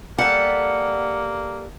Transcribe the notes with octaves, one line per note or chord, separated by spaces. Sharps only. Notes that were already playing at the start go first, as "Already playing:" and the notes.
G3 A#3 A4 F#5